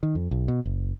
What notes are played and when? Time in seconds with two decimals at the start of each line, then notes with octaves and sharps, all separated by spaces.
0.03 D#3
0.15 F2
0.31 B1
0.48 B2
0.65 F#1